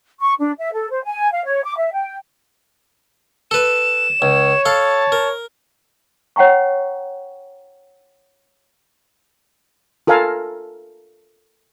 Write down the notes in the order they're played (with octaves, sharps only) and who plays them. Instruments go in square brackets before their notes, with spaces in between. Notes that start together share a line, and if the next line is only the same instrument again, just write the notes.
[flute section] C#6
D4
E5
A4
C5
G#5
F5
C#5
D6
E5
G5
[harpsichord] A4 B4 [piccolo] E7
[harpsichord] C#2 [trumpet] C#5
[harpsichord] A4 F5 [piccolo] A5
[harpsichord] A#4
[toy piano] C#5 F#5 G5 A#5 C#6
[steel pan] F4 A4 A#4 F5 G#5 A#5